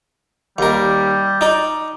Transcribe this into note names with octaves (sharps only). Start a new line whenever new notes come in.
D#2 G3 A#4
D#4 D5